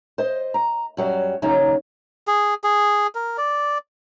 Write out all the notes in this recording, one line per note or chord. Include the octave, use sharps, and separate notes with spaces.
C5 D#5
A#5
F#2 F#3 G3
D#2 C#3 F#3 C#4 D#4 A#5
G#4
G#4
A#4
D5